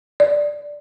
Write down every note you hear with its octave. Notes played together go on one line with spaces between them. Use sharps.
D5